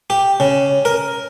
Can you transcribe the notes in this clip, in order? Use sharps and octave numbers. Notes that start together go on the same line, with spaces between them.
G4
C#3
A#4